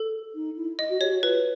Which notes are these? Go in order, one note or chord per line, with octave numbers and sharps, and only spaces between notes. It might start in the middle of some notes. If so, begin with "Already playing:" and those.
Already playing: A4
D#4
E4
D#5
F#4
G4 C#5
F#4
F4 B4